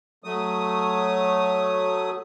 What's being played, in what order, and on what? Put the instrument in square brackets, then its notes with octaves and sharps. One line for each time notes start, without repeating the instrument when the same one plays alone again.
[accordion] F#3 A3 D#6